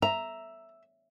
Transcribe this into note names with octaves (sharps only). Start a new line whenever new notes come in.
E5 A#5